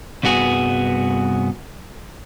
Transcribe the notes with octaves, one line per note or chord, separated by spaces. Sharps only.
C2 G2 B3 F#4 G#4